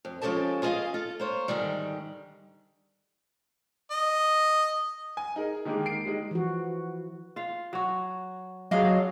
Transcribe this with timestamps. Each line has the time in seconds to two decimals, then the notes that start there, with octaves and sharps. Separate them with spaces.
0.05 F2
0.21 F3 G#3 C#4 G4 A4 A5
0.62 F4 G#4 A#4 D5 D#5 F5
0.94 F4 A4
1.20 A#3 C5 C#5
1.48 G#2 D3 D#3 G3
3.91 D#5
5.17 G#5
5.36 D#4 G#4 A#4
5.65 D3 D#3 G#3 A#3 G4 G#4
5.86 C7 D7
6.05 G3 G#3 D#4
6.31 E3 F3 F#4
7.36 F4 F5
7.73 F#3 F#4
8.71 F#3 D4 F4 G#4 D#5 F5